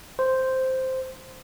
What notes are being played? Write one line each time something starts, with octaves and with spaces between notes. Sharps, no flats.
C5